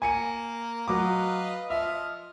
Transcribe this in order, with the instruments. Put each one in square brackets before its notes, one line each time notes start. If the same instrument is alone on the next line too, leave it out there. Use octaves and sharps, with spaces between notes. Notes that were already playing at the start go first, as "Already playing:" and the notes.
[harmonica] A#3 [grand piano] G#5 C#7 D#7
[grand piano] F#3 D6 [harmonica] B4 D#5 F5
[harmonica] F3 D#5 F6 [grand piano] E5